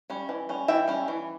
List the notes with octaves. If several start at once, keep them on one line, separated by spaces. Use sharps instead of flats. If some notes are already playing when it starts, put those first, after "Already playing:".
G3 C#4
E3
G3 C#4
E3 E5 G5
G3 C#4
E3